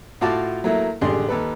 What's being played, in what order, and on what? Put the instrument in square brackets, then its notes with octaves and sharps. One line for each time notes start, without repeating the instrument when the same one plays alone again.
[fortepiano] A2 F4 F#4 A5 D6
F#3 A3 A#3 E4
A1 D3 G#3 G4 G#4 C6
D#2 A4 B4